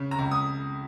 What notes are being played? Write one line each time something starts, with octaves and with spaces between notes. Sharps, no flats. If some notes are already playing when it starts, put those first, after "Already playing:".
Already playing: C#3
A#5
C#2
D#6